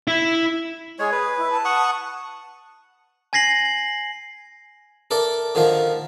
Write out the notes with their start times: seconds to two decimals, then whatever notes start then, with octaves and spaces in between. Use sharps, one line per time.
0.08 E4
0.99 G#3 G#4 C#5
1.12 B4
1.37 E4
1.50 A5
1.65 F#5 C#6 D#6
3.33 G#5 G#6 A#6 C7 F#7
5.11 A4 A#4 D5 E5
5.55 D3 D#3 F3 A#4